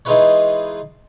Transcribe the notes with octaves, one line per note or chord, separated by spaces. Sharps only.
E3 G#3 D#4 F4 B4 C#5